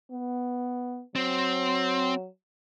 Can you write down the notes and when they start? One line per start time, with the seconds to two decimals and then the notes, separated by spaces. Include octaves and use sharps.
0.12 B3
1.16 F#3 C4